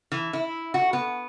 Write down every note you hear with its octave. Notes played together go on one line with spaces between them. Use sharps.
E3
E4
F#4
B3